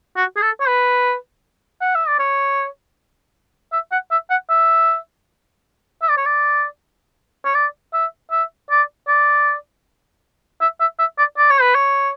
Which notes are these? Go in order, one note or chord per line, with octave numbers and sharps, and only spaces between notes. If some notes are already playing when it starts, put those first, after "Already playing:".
F#4
G#4
A4
C#5
B4
F#5
E5
D5
C#5
E5
F#5
E5
F#5
E5
E5
D5
C#5
D5
C#5
D5
E5
E5
D5
D5
E5
E5
E5
D5
D5
C#5
B4
C#5